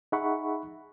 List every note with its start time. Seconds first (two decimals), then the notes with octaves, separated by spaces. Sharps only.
0.12 D#4 G#4 E5 F#5 B5 C#6